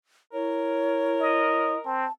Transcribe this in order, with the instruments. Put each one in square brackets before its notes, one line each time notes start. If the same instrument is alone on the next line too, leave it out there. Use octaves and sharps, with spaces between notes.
[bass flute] E4 [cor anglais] A#4 [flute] C#5
[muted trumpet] D#5
[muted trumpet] C4 [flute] A5